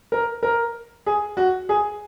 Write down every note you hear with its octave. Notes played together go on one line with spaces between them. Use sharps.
A#4
A#4
G#4
F#4
G#4